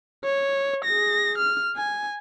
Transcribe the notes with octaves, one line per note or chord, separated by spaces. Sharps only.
C#5
G#4 A#6
F6
G#5